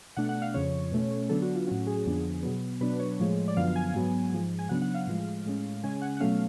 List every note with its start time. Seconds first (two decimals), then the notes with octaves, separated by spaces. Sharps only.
0.17 B2 A3 D4 F#5
0.29 F#5
0.42 F5
0.54 F2 C#3 F3 C#5
0.92 B2 A3 C#4
1.29 D3 F#3 B3 D4 A4
1.42 F#4
1.55 F4
1.67 A2 F#3 C#4 F#4
1.87 G#4
2.06 F2 D3 F3 B3 D4
2.43 B2 F#3 B3
2.81 B2 F#3 B3 D4 B4
3.00 C#5
3.19 A2 F3 G#3
3.48 D5
3.57 F#2 D3 F3 B3 F5
3.76 G#5
3.94 G#2 F#3 B3
4.32 G#2 F3 G#3
4.59 G#5
4.69 C#3 F#3 B3 D4 F#5
4.82 F#5
4.94 F5
5.07 A2 F3 G#3
5.46 A2 G#3 C#4
5.83 C#3 G#3 C#4 G#5
6.02 F#5
6.17 F#5
6.20 B2 F#3 A3 C#4 F5